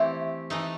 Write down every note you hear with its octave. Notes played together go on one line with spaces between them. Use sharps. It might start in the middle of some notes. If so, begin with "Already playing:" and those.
Already playing: E3 A3 C4 E4 G4
E3 A3 D#4